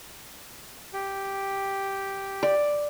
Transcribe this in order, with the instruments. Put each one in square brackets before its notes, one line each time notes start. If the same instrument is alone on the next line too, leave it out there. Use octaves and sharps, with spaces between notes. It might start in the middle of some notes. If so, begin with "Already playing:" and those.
[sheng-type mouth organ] G4
[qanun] D5